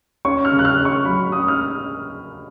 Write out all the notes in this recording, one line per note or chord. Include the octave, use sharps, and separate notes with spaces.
C#4 C#6
F6
C#3
F#6
F6
C#4
C#6
F#3 B5
C#4 D#6
F6